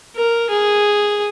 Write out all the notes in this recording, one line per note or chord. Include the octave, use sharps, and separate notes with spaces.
A#4
G#4